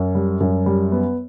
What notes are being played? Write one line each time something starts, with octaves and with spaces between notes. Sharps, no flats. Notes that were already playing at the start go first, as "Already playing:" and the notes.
Already playing: F#2
G3
F#2
G3
B3